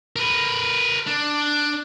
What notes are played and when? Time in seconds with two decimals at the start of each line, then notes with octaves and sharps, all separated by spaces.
0.16 A#4 B4
1.07 D4